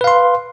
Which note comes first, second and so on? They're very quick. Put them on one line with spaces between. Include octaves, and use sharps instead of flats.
B4 F5 C6